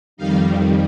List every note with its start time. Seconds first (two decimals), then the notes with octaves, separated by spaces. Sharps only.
0.17 F2 D#3 G3 D#4 F5